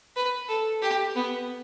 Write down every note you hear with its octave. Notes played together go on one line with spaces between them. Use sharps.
B4
A4
G4
B3